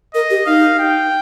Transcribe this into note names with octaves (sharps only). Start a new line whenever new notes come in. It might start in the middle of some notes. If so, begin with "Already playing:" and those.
A#4 D#5
G4
D#4 F5
G5